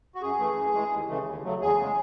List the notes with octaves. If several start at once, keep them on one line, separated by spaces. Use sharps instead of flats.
F#4
F#2 G#4
E3 A3
F#2
E3 G#3
D#2
C#3 E3 A3
D#2
C#3 F#3 A3
E2 G#4
C#3 G#3